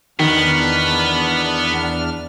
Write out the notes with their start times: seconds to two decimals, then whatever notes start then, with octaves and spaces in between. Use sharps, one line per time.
0.19 E2 D#3 B3 D4 F6